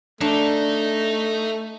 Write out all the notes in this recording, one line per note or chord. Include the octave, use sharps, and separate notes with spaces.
A3 D4 D#4